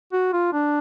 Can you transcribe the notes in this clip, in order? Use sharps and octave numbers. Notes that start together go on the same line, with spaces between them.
F#4
F4
D4